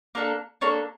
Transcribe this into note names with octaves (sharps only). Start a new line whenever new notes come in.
A#3 D4 A4 A#4
A#3 D4 A4 C#5